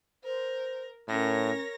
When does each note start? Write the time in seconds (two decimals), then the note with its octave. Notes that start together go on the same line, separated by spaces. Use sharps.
0.24 A#4 C5
1.09 A2 C#4 A#4 C#5 A#6